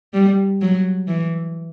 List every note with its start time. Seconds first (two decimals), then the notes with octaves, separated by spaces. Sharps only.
0.14 G3
0.62 F#3
1.08 E3